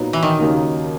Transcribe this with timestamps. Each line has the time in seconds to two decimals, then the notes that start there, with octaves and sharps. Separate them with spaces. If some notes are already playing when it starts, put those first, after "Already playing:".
Already playing: A#2 F#3 B3 D#4
0.13 E3
0.23 D#3
0.39 D#2 C#3 F#3 A#3 D#4